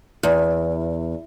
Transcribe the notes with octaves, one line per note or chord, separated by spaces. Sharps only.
E2